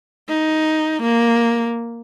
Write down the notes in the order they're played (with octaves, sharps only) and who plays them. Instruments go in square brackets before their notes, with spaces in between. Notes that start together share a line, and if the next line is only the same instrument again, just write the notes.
[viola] D#4
A#3